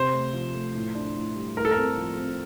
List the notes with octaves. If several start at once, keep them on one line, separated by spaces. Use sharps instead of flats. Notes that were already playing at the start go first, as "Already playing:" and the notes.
Already playing: C3 C5
A3
F3
A3
A2
D4
A2
G3
A2 A#4
A4
A#4
C4
F3
C4